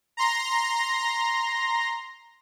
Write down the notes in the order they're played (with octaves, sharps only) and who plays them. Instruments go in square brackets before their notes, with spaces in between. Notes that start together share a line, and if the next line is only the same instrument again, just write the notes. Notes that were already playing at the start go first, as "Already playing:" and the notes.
[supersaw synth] A#5 C6 A#6